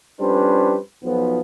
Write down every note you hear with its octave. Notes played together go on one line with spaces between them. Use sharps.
F2 G3 C#4 D4 B4 C5
B1 F3 B3